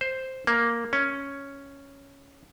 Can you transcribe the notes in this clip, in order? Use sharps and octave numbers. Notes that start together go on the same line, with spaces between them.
C5
A#3
C#4